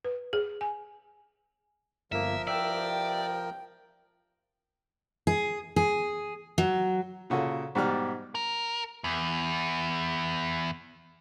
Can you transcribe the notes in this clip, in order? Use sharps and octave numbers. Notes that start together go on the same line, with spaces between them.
B4
G#4
G#5
G1 F3 A#3 A#4 E5
C2 G2 D5 E5 G5 E6
G#4
G#4
F#3
A#2 C#3 F#4 A4
G#2 B2 G3 G4 D5 F6
A#4
E2